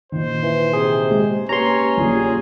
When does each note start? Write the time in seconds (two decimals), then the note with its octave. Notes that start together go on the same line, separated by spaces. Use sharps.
0.12 A#2 D#3 C5
0.43 E3
0.73 C3 G#4
1.10 G#3
1.49 A#3 C#4 G4 B4 C#5 A#5 C6
1.97 A#1 F3 G4 G#4